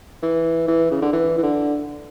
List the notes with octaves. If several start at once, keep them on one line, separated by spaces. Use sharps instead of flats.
E3
E3
C#3
D3
E3
E3
D3